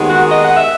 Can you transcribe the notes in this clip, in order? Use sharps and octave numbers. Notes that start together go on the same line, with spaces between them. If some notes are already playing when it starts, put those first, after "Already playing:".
Already playing: D#2 D#3 G#3 B3
F#4
D#5
F#5
E5